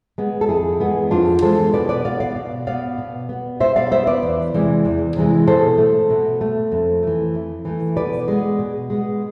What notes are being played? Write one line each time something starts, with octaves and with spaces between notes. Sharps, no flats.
G#3 B3
A4
F2 E4 G#4
E3 G#3 B3
F2 D4 F4
E3 G#3 B3 A4 C5
B2 B4 D5
B4 D5
B3 D5 F5
D5 F5
B2
B3 D5 F5
B2
B3
B2 C5 E5
D5 F5
B3 C5 E5
B4 D5
E2
C3 E3 G#3
E2
C3 E3 G#3
B2 A4 C5
A3
B2
A3
F2
E3 A3
F2
E3 A3
B2 B4 D5
G#3 B3
B2
G#3 B3